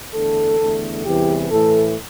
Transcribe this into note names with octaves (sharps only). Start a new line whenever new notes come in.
E2 D3 A3 A4
E2 D3 A3
E2 C3 E3 G3 G4
A2 E3 A3 A4